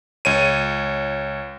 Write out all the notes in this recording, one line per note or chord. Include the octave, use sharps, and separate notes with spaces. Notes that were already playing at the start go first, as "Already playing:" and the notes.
C#2 C#5 D#7